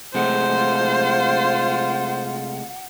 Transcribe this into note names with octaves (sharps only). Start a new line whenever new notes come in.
C3 G#3 A3 C5 F#5
F4